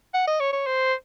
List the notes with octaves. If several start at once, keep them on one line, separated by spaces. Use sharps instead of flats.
F#5
D#5
C#5
C#5
C5